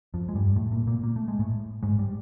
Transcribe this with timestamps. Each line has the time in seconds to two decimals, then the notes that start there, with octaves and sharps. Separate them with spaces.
0.14 F2 F3
0.29 G#3
0.35 G2 G3
0.56 A2 A3
0.72 A#2 A#3
0.87 A#2 A#3
1.03 A#3
1.16 A3
1.28 G#3
1.39 A2 A3
1.83 G#2 G#3
1.99 G3